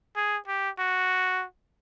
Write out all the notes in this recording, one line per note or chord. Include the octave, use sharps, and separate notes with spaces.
G#4
G4
F#4